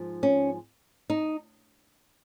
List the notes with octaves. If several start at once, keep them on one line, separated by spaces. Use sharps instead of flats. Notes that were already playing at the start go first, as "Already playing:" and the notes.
Already playing: G#2 F3
C#4
D#4